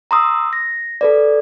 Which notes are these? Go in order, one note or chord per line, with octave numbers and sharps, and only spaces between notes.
A#5 C6 D#6 E6
A#6
A4 B4 D5